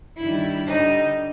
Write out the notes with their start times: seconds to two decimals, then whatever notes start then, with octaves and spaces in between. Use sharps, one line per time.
0.18 G2 D#3 G3 E4
0.67 G2 D3 G3 D#4